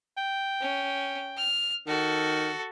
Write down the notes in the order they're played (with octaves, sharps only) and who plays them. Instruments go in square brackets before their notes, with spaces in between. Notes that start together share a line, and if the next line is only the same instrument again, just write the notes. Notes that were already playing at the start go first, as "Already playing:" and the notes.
[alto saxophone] G5
[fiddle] C#4
F6
[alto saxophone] D#3 [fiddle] F#4 A4